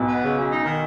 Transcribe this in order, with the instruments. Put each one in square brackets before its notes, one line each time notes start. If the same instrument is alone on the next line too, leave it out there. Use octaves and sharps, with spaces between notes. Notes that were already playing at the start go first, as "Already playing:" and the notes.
Already playing: [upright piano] B1 B2
[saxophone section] B3
C#3
F#2
D#4
D#3